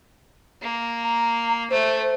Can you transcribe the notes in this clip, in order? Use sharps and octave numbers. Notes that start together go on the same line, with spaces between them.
A#3
A#5
A3 C5